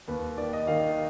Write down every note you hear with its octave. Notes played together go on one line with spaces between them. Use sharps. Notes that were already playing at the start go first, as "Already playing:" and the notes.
D#2 B4
D#3 D5
D#5
D#3 F5